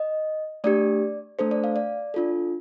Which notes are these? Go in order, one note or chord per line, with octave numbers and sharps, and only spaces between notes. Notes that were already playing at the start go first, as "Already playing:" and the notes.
Already playing: D#5
A3 D4 G4 D5
A3 D4 A4 C5
D5
F5
D5
D4 F4 A4